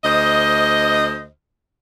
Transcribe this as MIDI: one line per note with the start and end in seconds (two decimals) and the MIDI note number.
0.04 1.26 38
0.04 1.26 72
0.04 1.26 75